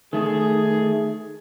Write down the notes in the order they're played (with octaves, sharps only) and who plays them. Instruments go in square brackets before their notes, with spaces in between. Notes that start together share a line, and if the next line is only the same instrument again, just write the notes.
[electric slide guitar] D#3 A3 [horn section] G#4